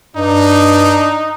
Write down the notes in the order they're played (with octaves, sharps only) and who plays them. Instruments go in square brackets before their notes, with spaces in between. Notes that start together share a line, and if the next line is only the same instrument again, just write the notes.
[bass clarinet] G2 [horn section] D4 [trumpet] D#4